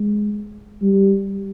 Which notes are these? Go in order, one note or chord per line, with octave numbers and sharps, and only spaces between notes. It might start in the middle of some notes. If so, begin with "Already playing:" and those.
Already playing: G#3
G3